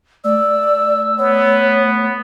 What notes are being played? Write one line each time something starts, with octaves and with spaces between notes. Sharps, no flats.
A3 D5 E6
B3 C#5